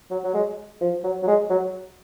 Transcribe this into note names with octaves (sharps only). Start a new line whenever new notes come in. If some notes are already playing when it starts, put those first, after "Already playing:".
F#3
F#3
G#3
F3
F#3
F#3
G#3
F#3